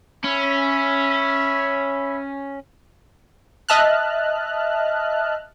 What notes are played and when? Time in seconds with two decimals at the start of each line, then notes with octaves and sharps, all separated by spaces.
0.24 C#4 C#5 E5 B5
3.69 D#5 E5 A5 F6 F#6